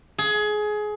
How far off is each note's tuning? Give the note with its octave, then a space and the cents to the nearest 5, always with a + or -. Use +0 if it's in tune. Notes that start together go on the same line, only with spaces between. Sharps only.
G#4 +20